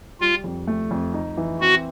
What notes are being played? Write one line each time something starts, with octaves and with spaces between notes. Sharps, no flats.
G3 F4
F2
A3
F2
D#4
E3
C4 F#4